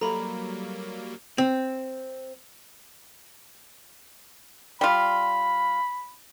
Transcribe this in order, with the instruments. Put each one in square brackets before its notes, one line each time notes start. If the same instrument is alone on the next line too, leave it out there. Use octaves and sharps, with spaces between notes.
[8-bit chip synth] F#3 G3 A#3 [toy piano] A4 D#5 [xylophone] A#5 B5
[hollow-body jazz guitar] C4
[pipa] G3 F4 [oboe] B5